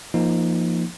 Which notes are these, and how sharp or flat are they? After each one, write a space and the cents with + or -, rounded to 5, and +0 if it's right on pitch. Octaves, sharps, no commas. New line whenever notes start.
F3 -20 A#3 +0 D#4 +0